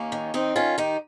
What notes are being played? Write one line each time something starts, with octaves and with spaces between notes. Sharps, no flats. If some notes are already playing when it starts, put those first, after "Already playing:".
Already playing: D#2 A#3 C#4
D#3
D#3 C4 D#4
D#3 C#4 F4
D#3 D#4 G4